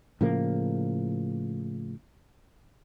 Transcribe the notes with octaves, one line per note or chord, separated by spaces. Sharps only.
A2 C#3 F3 A#3